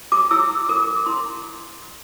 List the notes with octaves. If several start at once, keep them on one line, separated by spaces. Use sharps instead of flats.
D6
E4 E6
A#4 D6
E4 C6